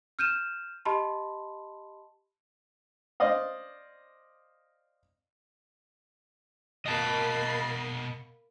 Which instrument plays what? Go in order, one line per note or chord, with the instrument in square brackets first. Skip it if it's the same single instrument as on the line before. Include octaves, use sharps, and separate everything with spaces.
[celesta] F6 G6 D#7 E7
G4 D#5 A5 B5 C6
[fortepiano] C5 D5 D#5 F5
[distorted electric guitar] B2 G#3 [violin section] A#3 B5 C7 [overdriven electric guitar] D#5 A5